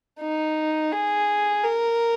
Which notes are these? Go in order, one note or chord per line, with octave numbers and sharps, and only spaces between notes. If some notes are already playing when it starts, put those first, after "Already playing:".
D#4
G#4
A#4